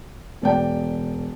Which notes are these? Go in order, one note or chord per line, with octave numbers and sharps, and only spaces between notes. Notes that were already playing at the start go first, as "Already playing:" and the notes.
E1 D5 G5